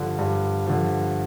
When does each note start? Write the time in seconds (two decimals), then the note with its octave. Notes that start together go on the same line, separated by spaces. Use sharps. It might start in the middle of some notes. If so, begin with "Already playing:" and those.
Already playing: G2 D3 F3
0.19 G2
0.67 D3 F3